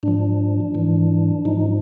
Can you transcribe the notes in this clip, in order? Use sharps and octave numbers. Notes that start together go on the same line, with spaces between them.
G#2 F3 D4
G#2 E3
G#2 F3 D#4